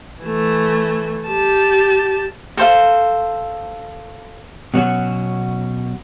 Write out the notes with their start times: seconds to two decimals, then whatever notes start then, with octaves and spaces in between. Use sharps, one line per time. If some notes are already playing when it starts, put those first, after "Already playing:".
0.23 E3 A3
1.26 G4 A5
2.57 A4 C5 F5
4.74 B2 F#3 C#4 F#4